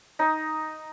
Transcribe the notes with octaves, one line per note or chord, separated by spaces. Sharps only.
D#4